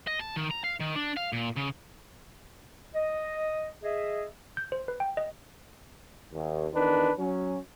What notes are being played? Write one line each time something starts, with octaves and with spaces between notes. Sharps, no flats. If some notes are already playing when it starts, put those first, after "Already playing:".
D#5
A5
D#3
A#5
F5
D#3
D4
F5
A#2
C#3
D#5
G#4 D#5 E5
G6
C5
B4
G5
D#5
D#2
E2 D#3 D4 B4
F#3 C#4